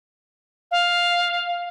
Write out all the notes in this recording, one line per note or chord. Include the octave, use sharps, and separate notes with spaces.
F5